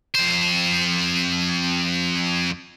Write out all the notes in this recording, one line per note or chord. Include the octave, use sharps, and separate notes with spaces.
F2 C5